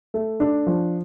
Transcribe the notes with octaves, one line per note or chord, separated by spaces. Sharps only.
A3
D4
F3